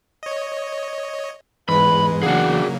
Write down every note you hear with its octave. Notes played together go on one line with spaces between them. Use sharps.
C#5 D#5
E2 G#2 G#3 B4 B5
C#3 F#3 A#3 D4 F#4 G#4 F#5